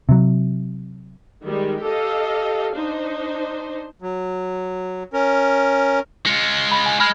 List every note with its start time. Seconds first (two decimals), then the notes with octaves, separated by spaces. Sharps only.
0.09 C3 F#3
1.43 D#3 G3 G#3
1.82 G4 A4 D#5 F5
2.75 D4 D#4 C5
4.02 F#3
5.13 C#4 A#4
6.26 G#3 F4 C#7
6.72 B5
6.86 G#5
7.00 G#3 B5 F6 G#6